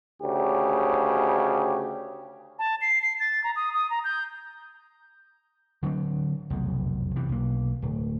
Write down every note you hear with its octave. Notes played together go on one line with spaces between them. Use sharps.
D2 C#3 G4
A5
C7
C7
A6
A#5
D#6
D#6
A#5
G6
D3 F#3 G#3 C4
F1 B1 E2
C3 E3
B1 A#3
D1